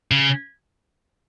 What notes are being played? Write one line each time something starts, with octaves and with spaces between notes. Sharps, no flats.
C#3